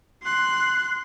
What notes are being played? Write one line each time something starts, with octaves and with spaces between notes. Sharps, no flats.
C6 F#6